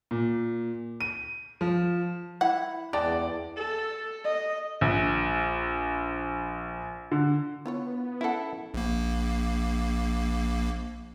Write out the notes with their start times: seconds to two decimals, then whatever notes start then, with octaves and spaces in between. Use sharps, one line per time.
0.11 A#2
1.01 D#7
1.61 F3
2.41 E4 F#5
2.93 E2 G#3 B4 D5 G5 A5
3.56 A4
4.24 D#5
4.81 A#1
7.12 D3
7.66 B3 E4 F4 C#5
8.21 C#4 E4 A4 F5 F#5
8.74 A#1 A#3